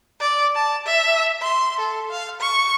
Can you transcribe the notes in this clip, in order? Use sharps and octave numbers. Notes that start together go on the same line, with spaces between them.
D5
A5
E5
C6
A4
F5
C#6